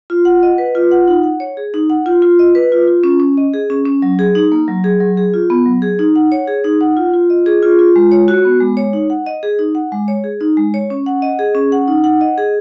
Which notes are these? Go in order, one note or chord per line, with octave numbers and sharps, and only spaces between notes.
F4
F#5
D#5
B4
F4
F#5
D#4
F#5
C#5
G#4
D#4
F#5
F4
F4
D#5
B4
F4
F4
C#4
C#4
D#5
G#4
C#4
C#4
F#3
G#4
D#4
A#3
F#3
G#4
F#3
G#4
F4
B3
F#3
G#4
D#4
F#5
C#5
G#4
D#4
F#5
F4
F4
D#5
G#4
F4
F4
G#3
C#5
F#4
B3
G#3
C#5
D#4
F#5
D#5
G#4
D#4
F#5
G#3
C#5
G#4
D#4
G#3
C#5
C#4
F#5
D#5
G#4
C#4
F#5
D#4
F#5
D#5
G#4